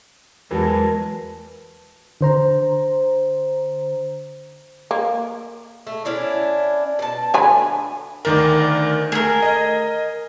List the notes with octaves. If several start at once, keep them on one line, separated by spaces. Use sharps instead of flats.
E2 E3 F#3 G#3 A#4 B4 A5
D3 C5 A#5
A#3
A3
C#4 D4 E4
B2 A5
D3 G#5 B5
D2 D#3 A#4 D5
A3 G#4 A#4
D#5